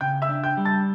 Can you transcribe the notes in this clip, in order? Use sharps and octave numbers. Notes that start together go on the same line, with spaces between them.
C#3 G5 G6
E5 E6
D4
G5 G6
G3
A5 A6